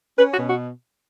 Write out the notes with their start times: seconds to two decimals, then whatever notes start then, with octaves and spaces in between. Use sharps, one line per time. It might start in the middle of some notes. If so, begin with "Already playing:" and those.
0.18 C#4 B4
0.33 F#4
0.38 B2
0.49 F#4